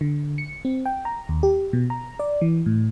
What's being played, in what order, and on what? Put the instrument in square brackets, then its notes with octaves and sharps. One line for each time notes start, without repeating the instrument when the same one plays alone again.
[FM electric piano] D3
C#7
C4
G5
A#5
D#2
G4
B2
A#5
D5
E3
A2